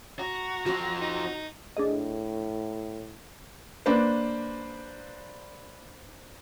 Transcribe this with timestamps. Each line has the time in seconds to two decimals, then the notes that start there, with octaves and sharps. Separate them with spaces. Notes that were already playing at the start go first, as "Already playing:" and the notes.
0.19 F#4 A#5
0.66 F3 C4 F#4
1.02 D#4
1.77 A2 D4 G#4 D#5
3.86 A#3 D4 B4 C5